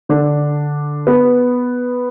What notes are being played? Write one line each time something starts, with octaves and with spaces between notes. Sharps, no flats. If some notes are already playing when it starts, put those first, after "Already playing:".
D3 D4
B3